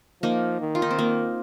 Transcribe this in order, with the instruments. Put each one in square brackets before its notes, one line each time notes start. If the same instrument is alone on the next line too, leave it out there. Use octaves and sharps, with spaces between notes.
[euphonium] F3 [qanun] A#3 D#4
[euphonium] D#3
[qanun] F4
D#4
C4
A#3